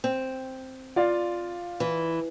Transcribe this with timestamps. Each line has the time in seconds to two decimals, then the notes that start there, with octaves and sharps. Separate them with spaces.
0.04 C4
0.96 F4 D5 F5
1.80 E3